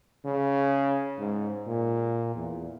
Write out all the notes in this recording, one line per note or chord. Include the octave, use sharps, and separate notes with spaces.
C#3
G#2
A#2
E2